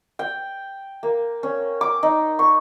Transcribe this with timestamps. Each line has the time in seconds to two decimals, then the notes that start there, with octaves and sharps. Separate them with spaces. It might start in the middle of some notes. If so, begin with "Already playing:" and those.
0.19 G5
1.03 A#3
1.43 C#4
1.81 D6
2.03 D#4
2.39 C#6